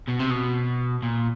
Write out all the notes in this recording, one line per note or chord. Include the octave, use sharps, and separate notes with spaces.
B2
C3
B2
A#2